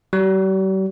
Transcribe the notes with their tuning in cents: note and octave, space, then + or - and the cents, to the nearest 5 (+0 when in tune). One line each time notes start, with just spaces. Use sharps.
G3 -45